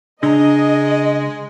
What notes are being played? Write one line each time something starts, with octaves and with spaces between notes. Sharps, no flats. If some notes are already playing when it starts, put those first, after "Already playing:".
C#3 G#3 D4 D#5 A#5